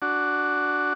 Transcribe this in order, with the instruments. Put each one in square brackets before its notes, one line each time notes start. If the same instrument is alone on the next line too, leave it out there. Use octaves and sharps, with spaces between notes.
[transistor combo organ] D4 F#4